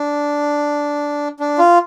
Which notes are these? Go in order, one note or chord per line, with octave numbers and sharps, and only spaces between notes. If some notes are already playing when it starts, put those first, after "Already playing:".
Already playing: D4
D4
F4